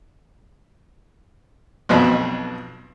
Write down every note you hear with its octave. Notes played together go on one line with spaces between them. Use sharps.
B1 F2 B2 B5